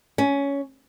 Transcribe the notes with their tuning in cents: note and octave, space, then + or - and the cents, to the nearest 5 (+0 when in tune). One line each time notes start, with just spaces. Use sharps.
C#4 +15